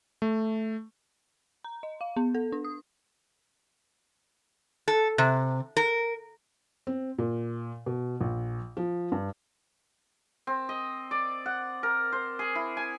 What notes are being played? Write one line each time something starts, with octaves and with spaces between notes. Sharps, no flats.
A3
A#5
D#5
F5
B3
A4
D4
D#6
A4
C3
A#4
C4
A#2
B2
A#1
F3
G2
C4
D#5
D5
F#5
A#4
C5
G#4
E4
G#5